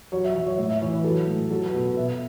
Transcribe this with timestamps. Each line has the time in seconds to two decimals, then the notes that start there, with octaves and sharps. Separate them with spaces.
0.12 F#3 C#5
0.24 E5
0.35 F#3 E5
0.47 C#5
0.58 A2 E5
0.69 E5
0.82 E3 C#5
0.92 B4
1.04 F#3 A4
1.27 A2
1.50 F#3 A4
1.62 B4
1.73 B2 F#4
1.85 B4
1.97 B2 E5